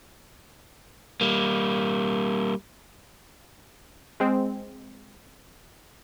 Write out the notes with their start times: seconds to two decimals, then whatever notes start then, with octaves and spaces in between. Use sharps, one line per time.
1.21 G3 A#3
4.20 G#3 C4